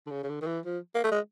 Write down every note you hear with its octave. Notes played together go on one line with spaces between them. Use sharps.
D3
C#3
C#3
D3
D#3
E3
F3
A#3
A3
G#3